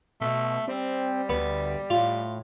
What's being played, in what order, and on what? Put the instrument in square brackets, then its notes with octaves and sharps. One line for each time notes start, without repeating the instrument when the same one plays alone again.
[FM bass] B2 [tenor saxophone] A3
[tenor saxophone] G3 [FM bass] C4
[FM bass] D2 [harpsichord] B3
[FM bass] A2 [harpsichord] F4